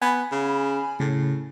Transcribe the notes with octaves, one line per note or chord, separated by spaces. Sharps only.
B3 G#5 B5
C#3
A2 C#3